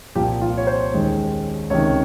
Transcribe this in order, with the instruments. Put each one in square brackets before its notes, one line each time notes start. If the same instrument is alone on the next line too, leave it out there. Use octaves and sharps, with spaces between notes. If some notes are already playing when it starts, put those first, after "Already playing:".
[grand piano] C2 A#2 F3 C4 G4
F4
C#5
C5
D#2 D#3 G#3 C#4
C#2 C3 D#3 C#5